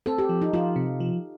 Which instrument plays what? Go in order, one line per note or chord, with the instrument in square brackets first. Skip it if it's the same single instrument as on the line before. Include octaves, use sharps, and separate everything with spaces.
[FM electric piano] C4 [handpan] A4
[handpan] G4
[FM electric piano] F3
[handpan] D#4
[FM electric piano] F3 [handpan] F4
[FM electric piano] C3
F3